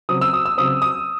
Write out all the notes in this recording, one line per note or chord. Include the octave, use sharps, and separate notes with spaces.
C#3 F#3 C4 D#6
E6
D#6
E6
C#3 F#3 C4 D#6
D#6